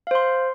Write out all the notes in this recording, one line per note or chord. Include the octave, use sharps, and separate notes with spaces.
C5 F5 C6